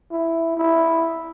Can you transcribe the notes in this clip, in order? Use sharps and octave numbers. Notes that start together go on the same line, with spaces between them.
E4
E4